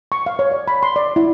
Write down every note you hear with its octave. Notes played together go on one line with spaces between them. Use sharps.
C#6
F5
C#5
D5
B5
C6
D5
E4